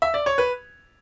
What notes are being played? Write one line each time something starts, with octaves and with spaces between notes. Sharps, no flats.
E5
D5
C#5
B4